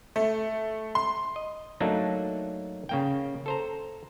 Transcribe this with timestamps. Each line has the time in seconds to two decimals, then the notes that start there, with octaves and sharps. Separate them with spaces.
0.16 A3
0.95 C6
1.36 D#5
1.80 F#3 A3 A#3 D4 D#4
2.89 C#3 A#3 G5
3.46 A4 C5 A#5